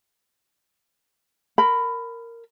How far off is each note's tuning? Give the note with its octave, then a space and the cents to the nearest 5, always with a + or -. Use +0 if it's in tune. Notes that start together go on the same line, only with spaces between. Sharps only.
A#4 -10 B5 +15